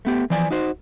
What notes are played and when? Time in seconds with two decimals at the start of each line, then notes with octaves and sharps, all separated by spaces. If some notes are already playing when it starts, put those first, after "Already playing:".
0.05 A3 B3 G4
0.30 E3 F3 D5 G#5
0.51 D#4 F#4 C5